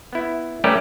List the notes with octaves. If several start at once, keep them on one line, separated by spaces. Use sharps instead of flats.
B3 E4
G3 A3 C#4 G4 A#4 B4